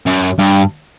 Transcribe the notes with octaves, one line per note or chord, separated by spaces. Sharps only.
F#2
G2